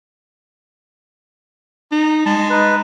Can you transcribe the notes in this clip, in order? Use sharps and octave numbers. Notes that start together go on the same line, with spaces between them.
D#4
G#3 A5
D#4 B4